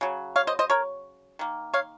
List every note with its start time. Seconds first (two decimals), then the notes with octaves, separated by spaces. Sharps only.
0.01 C#3 F#3
0.36 C#5 F5
0.47 C5 D#5
0.59 C5 D#5
0.70 A#4 C#5
1.39 D#3 A#3
1.74 C#5 F5